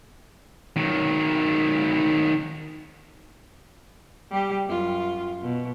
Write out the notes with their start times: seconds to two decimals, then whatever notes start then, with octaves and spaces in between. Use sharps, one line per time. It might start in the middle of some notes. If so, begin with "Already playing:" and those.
0.77 D#3 F#3
4.31 G3 G4
4.67 F#2 F4
5.41 B2